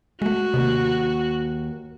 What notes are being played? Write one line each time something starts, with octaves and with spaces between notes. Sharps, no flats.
G#3 A3 F#4
D#2 C3